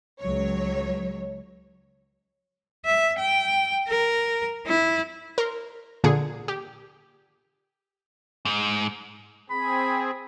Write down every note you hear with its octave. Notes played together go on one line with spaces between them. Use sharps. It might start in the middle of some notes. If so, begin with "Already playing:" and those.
C#2 F#3 C#5
E5
G5
A#4
E4
A#4 C6
A#2 D3 G#4 C#7
G4
G#2
C4 G#4 B5